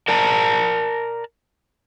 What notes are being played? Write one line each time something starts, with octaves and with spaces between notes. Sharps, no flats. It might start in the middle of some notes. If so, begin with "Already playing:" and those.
A#4 D5 A5 A#5